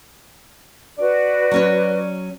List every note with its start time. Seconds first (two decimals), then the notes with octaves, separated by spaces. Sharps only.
0.99 F#4 B4 D5
1.51 F#3 C#4 C#5